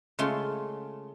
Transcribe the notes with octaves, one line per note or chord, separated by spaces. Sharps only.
C#3 G#3 A3 F4 C6